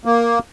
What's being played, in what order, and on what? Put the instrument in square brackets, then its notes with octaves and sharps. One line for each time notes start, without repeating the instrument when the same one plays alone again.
[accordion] A#3